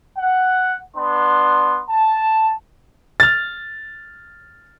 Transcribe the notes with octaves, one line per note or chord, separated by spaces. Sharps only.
F#5
B3 D4 C6
A5
F6 A6